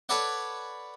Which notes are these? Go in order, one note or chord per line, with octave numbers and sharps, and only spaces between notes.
A4 B4 C#5 D5 F#5